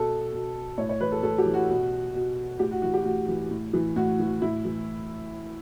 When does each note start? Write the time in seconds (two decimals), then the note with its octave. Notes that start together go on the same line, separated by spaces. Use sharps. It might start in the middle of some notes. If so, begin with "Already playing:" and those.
Already playing: B2 A4
0.32 B2
0.78 A2 C#5
0.89 C#5
1.01 E3 B4
1.12 A4
1.23 A2 A4
1.38 G4
1.46 E3
1.54 F#4
1.69 B2
2.14 B2
2.59 A2 G4
2.71 F#4
2.82 E3 F#4
2.94 G4
3.05 A2 F#4
3.28 E3
3.51 A2
3.73 E3
3.96 A2 F#4
4.19 E3
4.42 A2 E4
4.65 E3